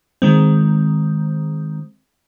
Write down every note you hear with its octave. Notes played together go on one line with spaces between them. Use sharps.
D#3 G#3 C4